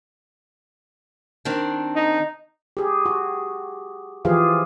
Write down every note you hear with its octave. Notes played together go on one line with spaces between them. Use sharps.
D#3 C4 D4
D#4
G4 G#4
F#4
E3 F3 F4 G4 G#4 F5